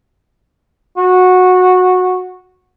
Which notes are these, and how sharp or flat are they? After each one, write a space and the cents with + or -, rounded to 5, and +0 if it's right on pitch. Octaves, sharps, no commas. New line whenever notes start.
F#4 -15